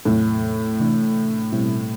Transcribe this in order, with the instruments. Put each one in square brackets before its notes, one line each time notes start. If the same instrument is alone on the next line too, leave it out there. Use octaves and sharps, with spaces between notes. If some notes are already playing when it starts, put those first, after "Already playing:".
[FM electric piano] E2 C3 F#3 C4 E4 [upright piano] A2
[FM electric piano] C3 E3 A3 D4
B2 G3 C4 E4